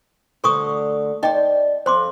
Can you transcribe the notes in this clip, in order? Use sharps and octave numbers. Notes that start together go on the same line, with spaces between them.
D2 D3 A4 C5 C#6 D#6
D#4 C5 D5 D#5 G5
F2 C5 C6 D6